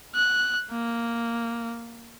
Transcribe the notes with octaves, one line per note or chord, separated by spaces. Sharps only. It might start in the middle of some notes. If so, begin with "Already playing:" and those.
F#6
A#3